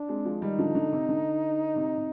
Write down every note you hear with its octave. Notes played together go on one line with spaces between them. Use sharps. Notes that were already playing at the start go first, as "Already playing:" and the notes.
Already playing: D4
G#3 C4
F3 G#3
D#3 G3 D#4
D3 F3
D3
C3
D3
C3
C3